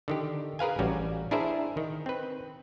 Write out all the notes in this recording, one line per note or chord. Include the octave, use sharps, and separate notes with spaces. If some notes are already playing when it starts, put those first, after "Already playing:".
D3 D#3 G4
G#4 A#4 B4 F5 G#5
A1 G3 C#4 F#4
D4 E4 G#4 A#4 C5 E5
D#3
C4 B4